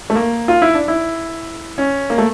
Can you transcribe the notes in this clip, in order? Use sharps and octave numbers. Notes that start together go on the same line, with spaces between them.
A3
A#3
F4
E4
D4
E4
C#4
A#3
A3